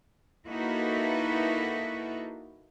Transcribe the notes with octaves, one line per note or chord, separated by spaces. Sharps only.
A#3 D#4 E4 F#4 A4 B4